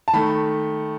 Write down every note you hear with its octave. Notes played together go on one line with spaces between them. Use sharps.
A5
D#3 A3 B5